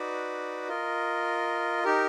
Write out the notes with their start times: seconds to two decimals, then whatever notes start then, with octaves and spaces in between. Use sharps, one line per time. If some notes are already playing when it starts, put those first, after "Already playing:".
Already playing: D#4 F#4 B4 D5
0.68 F4 A#4 D#5
1.83 D#4 G4 A#4